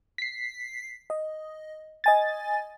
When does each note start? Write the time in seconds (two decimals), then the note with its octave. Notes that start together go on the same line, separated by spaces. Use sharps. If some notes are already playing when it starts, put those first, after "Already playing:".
0.18 B6 C7
1.10 D#5
2.04 D#5 G#5 A6